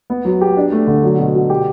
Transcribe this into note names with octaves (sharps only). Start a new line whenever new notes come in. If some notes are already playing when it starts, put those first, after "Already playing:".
B3
F#3
G4
D4
A3
D3
F#3
B2
B2
G4